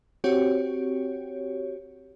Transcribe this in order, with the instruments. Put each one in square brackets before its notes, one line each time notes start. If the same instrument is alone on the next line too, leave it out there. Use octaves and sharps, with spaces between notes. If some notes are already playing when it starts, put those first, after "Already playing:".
[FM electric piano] C4 F#4 G4 C#5